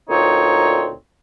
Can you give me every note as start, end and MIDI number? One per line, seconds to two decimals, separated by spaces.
0.08 0.91 38
0.08 0.91 46
0.08 0.91 60
0.08 0.91 63
0.08 0.91 73